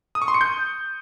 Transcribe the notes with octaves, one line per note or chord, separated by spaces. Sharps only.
D#6
C#6
C6
C#7
G6